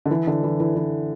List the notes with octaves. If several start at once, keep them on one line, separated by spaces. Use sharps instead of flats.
D3
E3
D3
E3
E3
E3